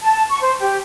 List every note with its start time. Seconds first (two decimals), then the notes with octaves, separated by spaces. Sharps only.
0.02 A5
0.29 C#6
0.42 C5
0.60 G4